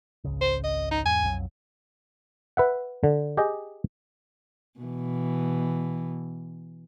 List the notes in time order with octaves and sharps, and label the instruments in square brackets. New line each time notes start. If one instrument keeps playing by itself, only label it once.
[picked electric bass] G#1 C#2 C#3
[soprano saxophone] C5
D#5
D#4
[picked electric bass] E2 G#2 [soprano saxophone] G#5
[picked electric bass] B1 F2 F#3
[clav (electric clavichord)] B4 E5 F#5
D3
G4 G#4 D#5 G5
[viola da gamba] B2 E3